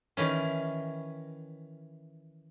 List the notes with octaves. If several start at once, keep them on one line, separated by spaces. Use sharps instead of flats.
D#3 E3 C#4